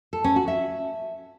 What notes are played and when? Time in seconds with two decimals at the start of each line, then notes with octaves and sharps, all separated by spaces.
0.13 A4
0.24 C#4
0.36 F#4
0.48 E5